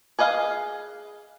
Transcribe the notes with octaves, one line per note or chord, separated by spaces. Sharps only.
G#4 B4 D#5 F5